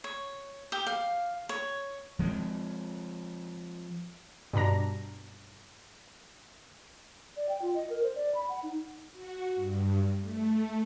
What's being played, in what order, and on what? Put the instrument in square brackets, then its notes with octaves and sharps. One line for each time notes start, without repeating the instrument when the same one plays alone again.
[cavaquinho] C#5
G4
F5
C#5
[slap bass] F3 G#3 B3 C4
[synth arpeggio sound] G2 B2 D4 A#5 A#6
[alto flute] D5
G5
F4
D#5
A#4
C5
D5
B5
F#5
D#4
[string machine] F#4
G2
A3